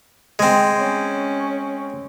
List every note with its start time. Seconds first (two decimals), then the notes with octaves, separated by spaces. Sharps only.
0.39 G#3 C4
0.79 C#4